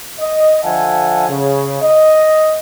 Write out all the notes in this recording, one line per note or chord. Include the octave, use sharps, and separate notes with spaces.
D#5
D3 F3 E5 F#5 G#5 A5
C#3
D#5